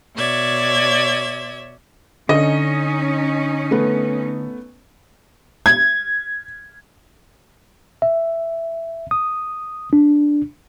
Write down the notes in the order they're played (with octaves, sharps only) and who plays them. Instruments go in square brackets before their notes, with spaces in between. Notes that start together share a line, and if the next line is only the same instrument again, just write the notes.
[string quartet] B2 C#5 D5 E5 G#6
[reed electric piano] D3 [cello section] C#4 D#4 [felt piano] D#5
[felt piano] A3 B3
[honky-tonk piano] G#6
[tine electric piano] E5
D#6
D4